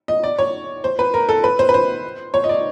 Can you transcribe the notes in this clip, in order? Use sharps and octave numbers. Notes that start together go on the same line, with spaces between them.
D#5
D5
C#5
C5
B4
A#4
A4
B4
C5
B4
C5
C#5
D#5
D5